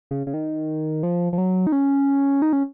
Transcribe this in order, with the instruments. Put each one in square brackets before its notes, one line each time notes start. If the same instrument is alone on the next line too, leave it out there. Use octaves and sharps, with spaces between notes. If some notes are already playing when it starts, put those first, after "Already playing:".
[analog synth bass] C#3
C#3
D#3
F3
F3
F#3
D#4
C#4
D#4
C#4